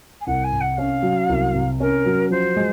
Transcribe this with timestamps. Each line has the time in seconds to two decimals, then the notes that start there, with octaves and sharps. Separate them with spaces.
0.21 G#5
0.27 C2 F#5
0.44 G#5
0.52 C3
0.61 F#5
0.77 C#4 F5
1.03 F#3
1.29 C2
1.54 C3
1.80 C#4 A#4
2.06 F#3
2.30 F3 C5
2.56 G#3